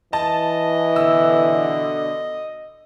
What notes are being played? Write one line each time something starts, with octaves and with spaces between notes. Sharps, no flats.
E3 D#5 A5
B2 D3 E6